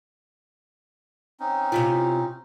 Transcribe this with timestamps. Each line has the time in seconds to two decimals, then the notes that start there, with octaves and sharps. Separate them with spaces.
1.40 C4 C#4 D#4
1.72 C3 E4 F4